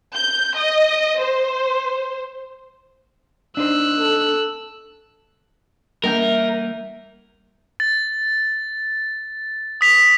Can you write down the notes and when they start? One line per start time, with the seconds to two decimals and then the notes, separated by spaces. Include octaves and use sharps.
0.14 G6
0.56 D#5
1.20 C5
3.57 D4 D#4 C5 E6 F#6
4.00 A4
6.04 E3 G3 A#3 A#4 G6
7.80 A6
9.81 D#6 B6 F7